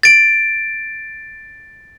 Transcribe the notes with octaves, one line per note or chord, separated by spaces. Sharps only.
A6 D7